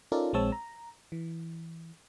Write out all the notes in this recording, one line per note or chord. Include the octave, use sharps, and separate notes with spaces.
C#4 D#4 F4 A4 A#4 D5
A#1 G#3 C4 C#5 A5 E6
A#5
E3